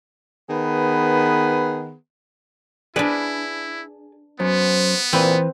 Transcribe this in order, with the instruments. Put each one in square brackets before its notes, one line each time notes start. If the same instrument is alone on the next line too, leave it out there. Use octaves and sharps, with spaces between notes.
[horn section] D#3 B3 G#4 B4
[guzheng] D4 B4 [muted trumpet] E4 [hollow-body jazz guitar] G#4 D5
[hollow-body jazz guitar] F#2 [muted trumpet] B3 [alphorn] C5
[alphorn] A#2 [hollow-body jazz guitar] E3 B4 [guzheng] C4